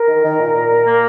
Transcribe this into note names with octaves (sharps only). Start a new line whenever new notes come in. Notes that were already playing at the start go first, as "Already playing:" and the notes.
Already playing: A#4
D#3
D#3
A#2
A#2
A#2
A#3